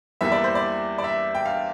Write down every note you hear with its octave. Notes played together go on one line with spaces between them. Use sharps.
E2 E3 G3 A#3 E5
D5
C5
D5
D5
E5
G5
F5